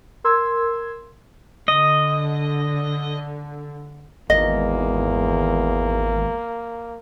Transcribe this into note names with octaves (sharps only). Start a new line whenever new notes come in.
A#4 C6 E6 G#6
D3 D#5
G#1 E2 A#3 D#5